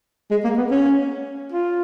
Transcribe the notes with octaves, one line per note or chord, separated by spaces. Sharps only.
G#3
A#3
B3
C#4
F4